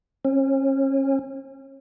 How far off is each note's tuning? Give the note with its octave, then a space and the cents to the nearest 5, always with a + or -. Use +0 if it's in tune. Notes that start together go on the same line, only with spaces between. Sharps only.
C#4 -35